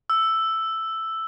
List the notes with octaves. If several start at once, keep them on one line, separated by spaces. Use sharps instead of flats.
E6